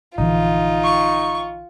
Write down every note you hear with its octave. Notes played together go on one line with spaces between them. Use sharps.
A#1 D3 E3 D#4 F4
C#6